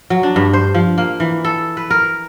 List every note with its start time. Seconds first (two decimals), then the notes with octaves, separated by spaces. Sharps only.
0.10 F#3
0.23 D4
0.36 G2
0.53 C5
0.75 F3
0.98 A#3
1.20 E3
1.44 A4
1.77 B4
1.91 A#4